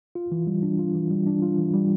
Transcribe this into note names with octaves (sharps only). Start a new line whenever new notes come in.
F4
E3
G3
D4
F4
E3
G3
D4
F4
E3
G3